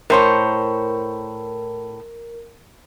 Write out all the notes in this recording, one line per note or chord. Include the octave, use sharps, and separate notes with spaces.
A2 A#4 C5 C#5